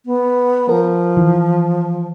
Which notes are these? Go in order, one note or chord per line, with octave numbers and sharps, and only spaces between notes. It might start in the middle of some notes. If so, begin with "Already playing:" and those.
B3
F3 A#4
E3